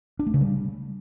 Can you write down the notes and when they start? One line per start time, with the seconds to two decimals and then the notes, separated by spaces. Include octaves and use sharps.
0.19 D4
0.27 A3
0.34 C#3
0.41 G3